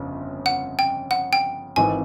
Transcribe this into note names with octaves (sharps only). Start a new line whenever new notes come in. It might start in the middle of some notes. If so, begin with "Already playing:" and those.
Already playing: G1 F2 C#3
F#5
G5
F#5
G5
G#1 G#2 E3 G#3 C4 G#5